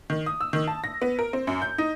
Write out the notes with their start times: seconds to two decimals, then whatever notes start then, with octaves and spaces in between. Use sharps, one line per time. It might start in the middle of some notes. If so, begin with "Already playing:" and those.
0.10 D#3
0.26 D#6
0.41 E6
0.53 D#3
0.68 A5
0.84 A#6
1.02 B3
1.19 A#4
1.33 C4
1.47 F#2
1.62 G6
1.78 D#4